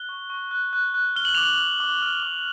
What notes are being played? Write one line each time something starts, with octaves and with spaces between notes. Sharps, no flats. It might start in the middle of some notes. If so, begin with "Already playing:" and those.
Already playing: F#6 G7
C#6
C#6
F#6
F#6
F#6
F6 G7
F#7
D6 F7
F#7
F6
D6
F6
D6